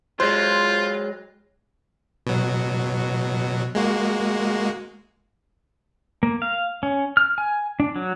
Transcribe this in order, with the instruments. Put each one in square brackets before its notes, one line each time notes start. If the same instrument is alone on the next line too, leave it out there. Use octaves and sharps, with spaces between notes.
[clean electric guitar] F#3 G#3 [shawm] F4 [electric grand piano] C5
[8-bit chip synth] B2 F#3
G#3 A#3 F#4
[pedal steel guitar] A#3
F5
C#4
F6
G#5
D4
F#3